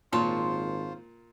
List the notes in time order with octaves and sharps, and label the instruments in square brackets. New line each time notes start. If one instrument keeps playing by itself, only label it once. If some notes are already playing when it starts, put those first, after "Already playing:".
[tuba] G#1 [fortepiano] A#2 [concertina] F4 C5 [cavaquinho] C#5 A5 C6